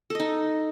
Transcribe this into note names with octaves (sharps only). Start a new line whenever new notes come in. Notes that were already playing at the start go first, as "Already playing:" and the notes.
D#4 A4 D#5